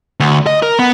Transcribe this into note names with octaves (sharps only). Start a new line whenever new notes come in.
D2
D#5
A#4
B3